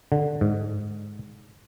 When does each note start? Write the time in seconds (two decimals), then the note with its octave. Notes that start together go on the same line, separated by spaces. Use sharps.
0.12 D3
0.41 G#2